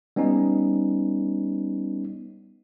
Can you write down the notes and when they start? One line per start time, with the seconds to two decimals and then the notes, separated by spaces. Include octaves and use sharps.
0.16 G3 B3 C#4 D#4